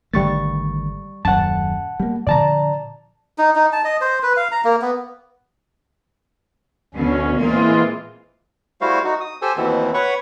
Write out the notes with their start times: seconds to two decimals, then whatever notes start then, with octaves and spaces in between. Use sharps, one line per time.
0.14 G#1 D3 G3 A3 C#6 A6
1.25 D#1 F#2 F#5 A5
2.00 G3 A#3
2.27 A#2 D3 F3 D5 A5 A#5
3.38 D#4
3.55 D#4
3.72 A5
3.84 D#5
4.01 C5
4.23 B4
4.37 F5
4.52 A#5
4.64 A#3
4.82 B3
6.94 D2 B2 D3 B3 C#4
7.37 A#2 E3 G#3 A#3 C4 F4
8.81 G3 A3 E4 F#4 C5 F5
9.04 D#4 F#4
9.21 D#6
9.42 G4 A4 C5 G#5 E6
9.57 D#2 B2 E3 B3 C4
9.94 B4 C#5 F#5 B5 C#6